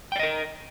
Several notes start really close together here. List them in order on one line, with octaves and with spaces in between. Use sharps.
G5 D5 D#5 A#4